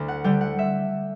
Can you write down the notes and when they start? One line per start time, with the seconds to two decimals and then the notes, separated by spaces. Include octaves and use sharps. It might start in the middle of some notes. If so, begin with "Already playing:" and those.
Already playing: D2
0.08 F#5
0.24 D3 G3 G5
0.41 F#5
0.59 E5